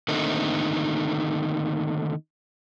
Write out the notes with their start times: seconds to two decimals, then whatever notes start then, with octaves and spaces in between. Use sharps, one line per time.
0.08 D3 D#3 A3 A#3 C4 D#4